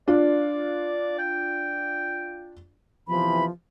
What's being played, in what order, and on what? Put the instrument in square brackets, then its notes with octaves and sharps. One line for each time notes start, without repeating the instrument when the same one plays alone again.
[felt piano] D4 F4 [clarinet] D5
[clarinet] G5
[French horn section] E2 C3 E3 [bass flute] F3 [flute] B5